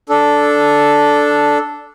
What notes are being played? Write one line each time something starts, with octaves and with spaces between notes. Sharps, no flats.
D4 A4